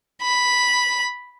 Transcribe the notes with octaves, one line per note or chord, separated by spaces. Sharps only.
B5